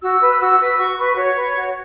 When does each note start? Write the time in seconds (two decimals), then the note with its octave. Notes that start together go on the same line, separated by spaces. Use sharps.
0.02 F#4 E6
0.21 B4
0.30 F#6
0.40 F#4 E6
0.60 B4 E6
0.79 F#4 C#6
0.98 B4 C#6
1.16 F#4 C#5
1.35 B4
1.55 F#4